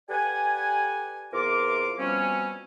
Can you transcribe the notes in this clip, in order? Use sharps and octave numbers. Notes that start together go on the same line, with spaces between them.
G4 A4 B4 D5 F#5 G#5
E2 C3 F4 A#4 F5 D6
B2 F3 G3 C4 C#4